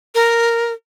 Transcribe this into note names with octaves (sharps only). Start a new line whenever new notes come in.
A#4